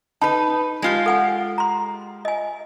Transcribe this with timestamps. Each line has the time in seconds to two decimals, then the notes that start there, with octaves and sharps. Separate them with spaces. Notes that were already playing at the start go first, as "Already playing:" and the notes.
0.22 D#4 B4 A5 B5
0.82 G#3 F4 G4
1.06 A4 F#5 G#5
1.58 A#5 C6
2.25 D#5 G#5